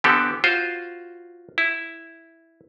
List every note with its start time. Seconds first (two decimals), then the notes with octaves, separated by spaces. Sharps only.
0.04 D3 E3 B3 C4 G4 A4
0.44 F4 F#4 C5
1.58 E4